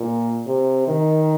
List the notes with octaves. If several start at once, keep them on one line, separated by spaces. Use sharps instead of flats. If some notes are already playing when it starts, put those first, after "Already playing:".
Already playing: A#2
C3
D#3